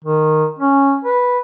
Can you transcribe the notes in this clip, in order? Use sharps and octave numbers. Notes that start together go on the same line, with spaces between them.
D#3
C#4
B4